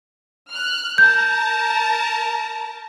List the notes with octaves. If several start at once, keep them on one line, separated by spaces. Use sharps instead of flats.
F6 F#6
A#4 A5 A#5 G6